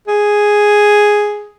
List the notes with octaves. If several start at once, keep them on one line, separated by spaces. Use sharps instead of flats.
G#4